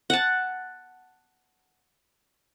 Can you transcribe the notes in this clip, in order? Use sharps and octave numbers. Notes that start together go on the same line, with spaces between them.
F#5 A5